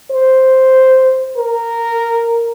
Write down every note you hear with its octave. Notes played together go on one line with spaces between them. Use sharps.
C5
A#4